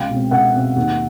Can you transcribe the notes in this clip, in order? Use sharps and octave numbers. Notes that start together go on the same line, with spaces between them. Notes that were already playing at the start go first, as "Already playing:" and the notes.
Already playing: C#2 F5 G5
B2 G#3 C4
C#2 E5 F#5
B2 G#3 C4
D#2